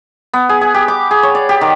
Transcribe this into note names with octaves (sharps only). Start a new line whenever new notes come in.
B3
G#4
G#4
G4
D6
G#4
C#5
D5
G4
D#3